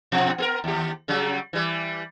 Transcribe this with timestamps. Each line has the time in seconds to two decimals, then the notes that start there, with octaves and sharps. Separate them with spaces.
0.12 B2 F3
0.38 B3 G#4 A#4
0.64 D#2 G4
1.08 C#3 F#3 G3
1.53 E3 G3